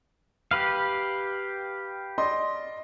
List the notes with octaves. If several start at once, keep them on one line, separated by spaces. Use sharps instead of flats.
G4 B4 F5
D5 D#5 C6